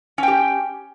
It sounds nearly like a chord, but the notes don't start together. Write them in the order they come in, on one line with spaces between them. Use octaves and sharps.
C#4 G5 G4